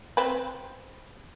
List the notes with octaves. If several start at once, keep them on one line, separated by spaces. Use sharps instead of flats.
C4 B4